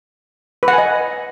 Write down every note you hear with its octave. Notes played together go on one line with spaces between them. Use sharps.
B4
F#5
G#5
D#5